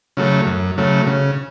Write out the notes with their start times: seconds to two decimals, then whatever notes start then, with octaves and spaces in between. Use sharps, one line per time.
0.17 C#3 F#3 A3
0.47 F#2
0.78 C#3 F#3 A3
1.07 C#3